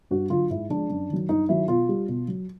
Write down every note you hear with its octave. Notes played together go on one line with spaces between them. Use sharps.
G2 F#4
D3 F#3 F4
G#2 E4
F3 G#3 D4
F#2
D#3 F#3
G2 D#4
D#3 F#3 E4
B2 F4
G3
B2
F#3